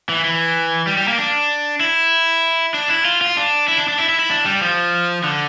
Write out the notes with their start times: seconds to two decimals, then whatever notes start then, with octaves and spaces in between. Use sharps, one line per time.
0.09 E3
0.24 E3
0.87 G3
0.97 G3
1.08 A#3
1.18 D4
1.81 E4
2.74 D4
2.89 E4
3.05 F4
3.21 F4
3.37 D4
3.68 E4
3.78 D4
3.88 D4
3.99 E4
4.09 E4
4.19 E4
4.30 D4
4.45 G3
4.61 F3
5.24 D3